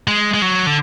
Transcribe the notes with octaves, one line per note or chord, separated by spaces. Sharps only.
G#3
G#3
F#3
D3